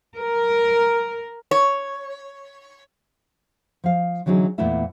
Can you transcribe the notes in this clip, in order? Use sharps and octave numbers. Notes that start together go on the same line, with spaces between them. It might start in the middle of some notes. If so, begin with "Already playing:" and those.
A#4
C#5
F3 F5
D3 E3 F#3 C#4 D#4 G#4
E2 A#2 A3 B3 E4 E5